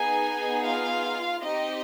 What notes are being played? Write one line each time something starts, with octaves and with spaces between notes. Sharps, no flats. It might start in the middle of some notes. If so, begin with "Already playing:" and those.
Already playing: B3 D#4 G#4 G#5
F4 F5
C4 D#4 G4 D#5